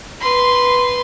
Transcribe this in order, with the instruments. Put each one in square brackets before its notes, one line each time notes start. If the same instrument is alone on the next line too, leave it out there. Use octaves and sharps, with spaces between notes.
[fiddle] B4 C6